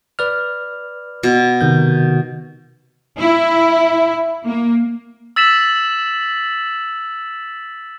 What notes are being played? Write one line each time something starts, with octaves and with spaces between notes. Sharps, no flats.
B4 D5 F6
B2
C3 D#3 G6
E4
A#3
E6 A6 B6 E7 F#7